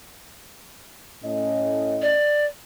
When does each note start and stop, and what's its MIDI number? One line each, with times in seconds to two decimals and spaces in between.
1.24 2.15 45
1.24 2.15 61
1.24 2.15 75
2.02 2.45 74